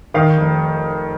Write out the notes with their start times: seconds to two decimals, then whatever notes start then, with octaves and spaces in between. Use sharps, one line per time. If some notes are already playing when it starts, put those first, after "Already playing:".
0.14 D#3 F5
0.37 F1